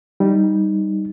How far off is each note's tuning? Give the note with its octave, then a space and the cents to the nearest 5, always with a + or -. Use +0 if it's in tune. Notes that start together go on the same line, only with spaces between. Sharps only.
G3 +0 D#4 +0